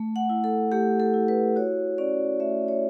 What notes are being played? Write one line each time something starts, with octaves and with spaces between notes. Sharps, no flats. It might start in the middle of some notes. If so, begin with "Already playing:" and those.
Already playing: A3
F#5
E4
A4
A3 G4
A4
E4
B4
F#4 C#5
C#4 D5
A3 E5
C#5